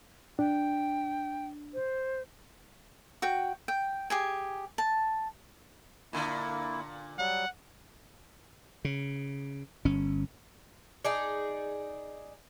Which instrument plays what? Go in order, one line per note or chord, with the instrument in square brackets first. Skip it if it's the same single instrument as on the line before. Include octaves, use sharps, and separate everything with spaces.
[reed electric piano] D4 [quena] G5
[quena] C5
[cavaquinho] F#4 G5
G5
G4 G#4 G#5
A5
[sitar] A#2 D3 [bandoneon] A#3 E4
[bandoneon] F#3 G3 [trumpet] F#5
[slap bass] C#3
G1 C#4
[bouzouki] D#4 G#4 D5